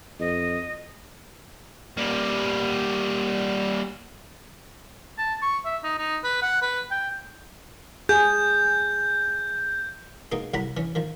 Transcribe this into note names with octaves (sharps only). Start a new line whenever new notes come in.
F2 D#5
G3 A#3
A5
C#6
E5
D#4
D#4
B4
F#5
B4
G5
G#4 G6
B2 G#3 A#3 D#4
C2 F#3 F#5 A#5 B5
E3 C#4
D#3 F3